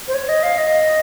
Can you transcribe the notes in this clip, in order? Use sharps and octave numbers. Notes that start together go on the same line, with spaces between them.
C5
C#5
D#5
F5
D#5